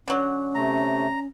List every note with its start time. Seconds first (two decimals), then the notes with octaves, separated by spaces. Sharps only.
0.08 D3 F#3 C#4
0.55 C3 A3 A#5